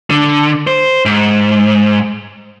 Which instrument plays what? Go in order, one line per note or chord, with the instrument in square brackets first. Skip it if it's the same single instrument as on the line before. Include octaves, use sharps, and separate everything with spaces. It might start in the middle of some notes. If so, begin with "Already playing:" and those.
[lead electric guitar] D3
C5
G#2